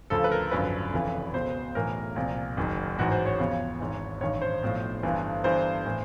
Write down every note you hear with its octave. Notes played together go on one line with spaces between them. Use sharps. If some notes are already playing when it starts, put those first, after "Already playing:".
D2 C#3 F3 A4
B4
A#4
G#1 F#2 D3 F3 B4
F1 F2 C#3 E3
C#2 B2 C5
B1 A2 E3 A#4
C2 A#2 F3
F#1 F#2 D#3
A1 G#2 E3 F#4
C5
C#5
E2 C#3 F3
G#1 G#2 E3
A1 G2 D#3 C#5
C5
B1 A2 F3
G1 G2 E3
G1 G2 E3 C5
A2 E3